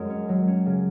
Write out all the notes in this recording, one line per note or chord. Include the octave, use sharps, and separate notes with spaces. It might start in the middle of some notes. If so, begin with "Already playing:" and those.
Already playing: F#2 G#3
C#4
F#3
C#4
C#3